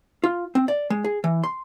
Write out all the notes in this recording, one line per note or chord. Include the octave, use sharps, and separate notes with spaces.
F4
C4
D5
G#3
G#4
E3
C6